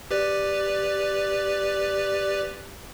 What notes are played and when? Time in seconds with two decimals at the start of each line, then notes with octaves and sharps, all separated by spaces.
0.11 G4 B4 D5